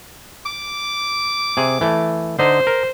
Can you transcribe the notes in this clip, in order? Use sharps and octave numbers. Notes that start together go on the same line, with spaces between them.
D6
C3 G#4
E3 A3
D3 D#4 C5
A#4